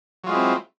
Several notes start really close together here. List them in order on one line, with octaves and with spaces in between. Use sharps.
F#3 F4 G#3 E4 C4